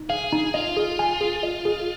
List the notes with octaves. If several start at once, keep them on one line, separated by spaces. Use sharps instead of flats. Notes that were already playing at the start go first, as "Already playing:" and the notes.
Already playing: D#4
G#4 F5
D#4
F4 D#5
G#4
G#5
G#4
D#5
G#4